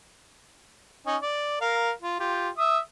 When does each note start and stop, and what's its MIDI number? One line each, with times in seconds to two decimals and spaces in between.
1.07 1.17 61
1.07 1.17 63
1.22 1.57 74
1.61 1.91 70
1.61 1.91 77
2.02 2.17 65
2.19 2.49 65
2.19 2.49 67
2.58 2.79 76
2.58 2.79 87